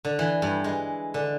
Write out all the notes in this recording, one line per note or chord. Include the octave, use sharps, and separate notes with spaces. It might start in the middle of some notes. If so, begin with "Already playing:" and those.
D3
E3
G2
G#3
D3